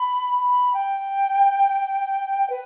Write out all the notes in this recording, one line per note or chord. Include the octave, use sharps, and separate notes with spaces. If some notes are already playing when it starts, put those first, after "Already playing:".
Already playing: B5
B5
G5
B4